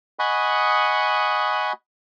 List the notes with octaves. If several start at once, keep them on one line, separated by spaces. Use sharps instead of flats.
D#5 F#5 G#5 B5 C#6 D#6